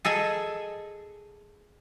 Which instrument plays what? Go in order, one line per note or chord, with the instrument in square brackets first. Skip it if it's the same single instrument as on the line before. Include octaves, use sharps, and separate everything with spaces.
[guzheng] G#4 A4 D#5 G#5